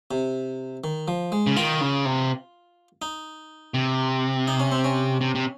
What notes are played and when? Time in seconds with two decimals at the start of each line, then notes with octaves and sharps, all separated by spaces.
0.11 C3
0.84 D#3
1.08 F3
1.32 G#3
1.47 C#3
1.56 D#3 F4
1.81 C#3
2.05 C3
3.02 D#4
3.74 C3
4.48 D#4
4.60 C#4
4.72 C4
4.84 C#4
5.21 C3
5.35 C3